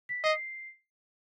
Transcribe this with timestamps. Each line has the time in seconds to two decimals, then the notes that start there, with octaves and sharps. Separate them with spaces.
0.09 B6
0.24 D#5 C7